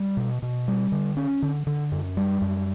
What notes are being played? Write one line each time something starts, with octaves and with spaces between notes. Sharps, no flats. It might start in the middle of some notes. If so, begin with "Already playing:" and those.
Already playing: G3
B2
B2
G3
D3
C#4
D3
D3
F#2
G3
F#2